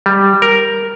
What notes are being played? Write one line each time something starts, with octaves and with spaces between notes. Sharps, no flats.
G3
A#4